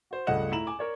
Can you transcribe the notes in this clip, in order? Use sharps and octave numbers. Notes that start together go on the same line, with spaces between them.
F#4 C5
C#2 G2 A3 D#5 F#5 E7
A2 E4 A#5 E7 F#7
G#5 D6
A#4 C#5 D5